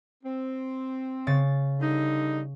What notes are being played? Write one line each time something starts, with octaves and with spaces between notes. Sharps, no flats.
C4
C#3 A6
D3 G3 D#4